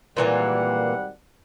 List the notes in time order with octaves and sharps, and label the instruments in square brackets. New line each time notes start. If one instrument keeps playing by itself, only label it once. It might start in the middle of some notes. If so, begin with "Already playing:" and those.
[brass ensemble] G#1 G3 F#5 [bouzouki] A#2 E3 A#3